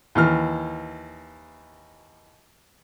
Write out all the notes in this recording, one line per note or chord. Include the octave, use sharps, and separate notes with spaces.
D#2 E3 F6